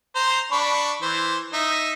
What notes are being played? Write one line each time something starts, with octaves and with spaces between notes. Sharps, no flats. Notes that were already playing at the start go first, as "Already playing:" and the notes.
C5 A#5 C6
D4 B5 C#6
E3 C5
D#4 E5